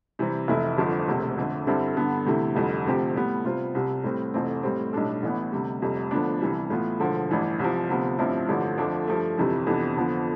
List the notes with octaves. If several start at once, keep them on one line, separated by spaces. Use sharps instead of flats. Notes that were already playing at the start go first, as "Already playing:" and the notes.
C3 E3 G3 C4
F1 F2 E3 A3 E4
G1 F2 D3 F3
E1 D2 C3
F2 D3 A3
G2 D3 G3 C4 E4
G2 D3 G3 B3
D2 C3 E3 A3 E4
F1 F2 D3 G3
D2 C3 F3 C4 G4
A2 G3 B3
C3 G3 B3 F4 C5
C2 C3 G3
A2 G3 C4
F1 F2 E3 A3 C4
A2 G3 C4
B1 A2 G3 D4 A4
A1 A2 E3 B3
D2 C3 G3
F1 F2 C3 G3
D2 D3 F3 B3 D4
C2 C3 E3 G3
A2 E3 B3 F4
E1 D2 D3 F3
A1 G2 E3 G3
C2 C3 F3
D2 C3 F3 B3
A1 G2 F3 C4 E4
A1 G2 D3 F3
F2 D3 F3 A3 D4
G2 F3 A3
G1 F2 C3 E3 G3
F2 C3 E3 B3 D4
F2 D3 F3 B3